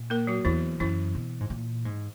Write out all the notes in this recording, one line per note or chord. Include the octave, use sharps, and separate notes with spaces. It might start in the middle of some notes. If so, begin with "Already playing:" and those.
Already playing: A#2
A#3 A#4
F#3 F#4
E2 E3 E4
F#2 E3 E4
B2
G#2
A#2
G#2